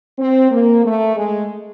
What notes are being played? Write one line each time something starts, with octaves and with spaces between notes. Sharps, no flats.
C4
A#3
A3
G#3